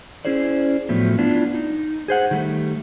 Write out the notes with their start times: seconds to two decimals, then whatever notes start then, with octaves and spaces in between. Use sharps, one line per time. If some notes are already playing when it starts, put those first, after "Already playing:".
0.25 C#4 E4 G#4 C5 D5
0.89 A2 F3 F#3 A3 B3
1.18 B3 D4 E4 F4
1.54 D#4
2.08 G#4 C5 F#5
2.31 D#3 G3 A3